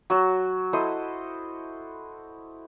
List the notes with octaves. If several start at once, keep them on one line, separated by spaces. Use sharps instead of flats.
F#3 F#4
E4 A4 C5 D#5